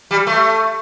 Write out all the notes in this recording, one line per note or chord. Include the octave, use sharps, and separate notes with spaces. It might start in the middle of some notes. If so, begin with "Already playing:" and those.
G3
A3